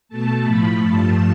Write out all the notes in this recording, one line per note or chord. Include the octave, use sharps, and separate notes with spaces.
B2 A3 A5
A2 F3 A3 B5
G2 F3 A3 A5